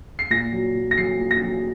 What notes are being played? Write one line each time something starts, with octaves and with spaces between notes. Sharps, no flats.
C7
A#2 A#6
F#3
A#2
A#6
F#3 C7
A#2
A#6
F#3